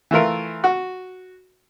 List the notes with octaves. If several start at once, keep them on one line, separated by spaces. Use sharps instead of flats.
E3 A3 F4 A#4
F#4